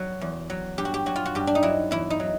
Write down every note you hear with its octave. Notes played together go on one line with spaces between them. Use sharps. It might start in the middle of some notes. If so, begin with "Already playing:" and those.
Already playing: F#3 F#4
E2
F#3
G2 G4
F#4
G4
F#3 F#4
F4
F#4
G2 G4
D4
D#4
F#3 E4
E2 E4
D#4
F#3